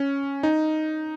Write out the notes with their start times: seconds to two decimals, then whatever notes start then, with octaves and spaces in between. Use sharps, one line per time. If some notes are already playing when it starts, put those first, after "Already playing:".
Already playing: C#4
0.43 D#4